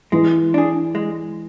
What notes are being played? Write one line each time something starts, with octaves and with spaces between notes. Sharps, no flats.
E3 G#3
D4 G#4
G#3